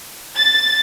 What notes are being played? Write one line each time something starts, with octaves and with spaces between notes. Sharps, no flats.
A6